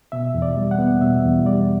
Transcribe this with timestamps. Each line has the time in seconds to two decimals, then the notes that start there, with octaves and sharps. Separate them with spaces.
0.12 B2 E5
0.34 E2
0.42 D5
0.57 G3
0.71 F#5
0.79 B3
1.01 B2 E5
1.24 E2
1.45 G3 D5